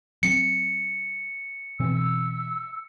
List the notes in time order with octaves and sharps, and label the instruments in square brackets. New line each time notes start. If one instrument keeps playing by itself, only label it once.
[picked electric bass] F#3 C4 [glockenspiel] C#7
[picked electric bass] B2 E3 C4 [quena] E6